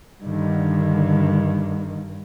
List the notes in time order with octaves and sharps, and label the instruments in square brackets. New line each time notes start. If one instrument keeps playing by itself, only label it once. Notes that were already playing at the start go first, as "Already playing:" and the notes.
[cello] G2 [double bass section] D3 D#3